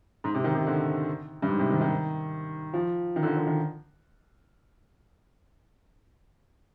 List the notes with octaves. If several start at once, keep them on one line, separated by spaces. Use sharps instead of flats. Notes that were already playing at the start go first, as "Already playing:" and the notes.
G#2
C3
D#3
C3
D3
G2
G#2
C3
D#3
D#3
F3
D#3
D3
D#3
D3
D#3